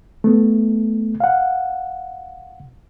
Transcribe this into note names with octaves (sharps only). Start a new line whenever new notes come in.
A3 B3
F5 F#5